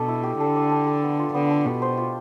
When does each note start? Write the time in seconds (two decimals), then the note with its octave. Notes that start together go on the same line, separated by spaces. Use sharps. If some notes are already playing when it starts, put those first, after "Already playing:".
Already playing: B2 D4 A4
0.08 E4
0.23 G4
0.40 D3 A4
0.56 D5
0.72 D4
0.87 A4
1.03 B3
1.19 F4
1.34 D3 B3
1.50 D4
1.66 B2 G4
1.82 C5
1.97 F4